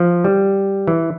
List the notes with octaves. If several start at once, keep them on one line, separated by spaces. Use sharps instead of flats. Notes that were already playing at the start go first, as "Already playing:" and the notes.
Already playing: F3
G3
E3